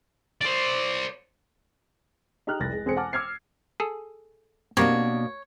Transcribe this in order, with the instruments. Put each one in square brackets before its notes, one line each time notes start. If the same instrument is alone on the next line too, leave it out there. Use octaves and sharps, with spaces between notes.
[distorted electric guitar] C5 D5
[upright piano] D#4 G4 A#5 F6 F#6
F1 C2 F#6 A6 A#6
G#3
E1 C4 G#4 A4 C5 C#7
F#5 G#5 A5 D6 F6
D6 E6 F6 G#6 C7
[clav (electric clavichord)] G#4 A4
[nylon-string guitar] B2 A#3 D4 [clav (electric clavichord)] C4 G4 A#4 [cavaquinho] C#5